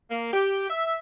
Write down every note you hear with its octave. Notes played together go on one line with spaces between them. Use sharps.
A#3
G4
E5